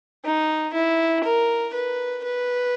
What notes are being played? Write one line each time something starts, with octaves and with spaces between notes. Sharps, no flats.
D#4
E4
A#4
B4
B4